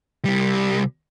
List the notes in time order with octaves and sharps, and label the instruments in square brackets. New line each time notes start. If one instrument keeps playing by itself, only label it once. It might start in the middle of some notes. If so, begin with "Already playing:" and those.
[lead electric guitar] C2 G3